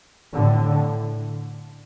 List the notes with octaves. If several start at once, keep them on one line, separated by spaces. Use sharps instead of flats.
A2 D3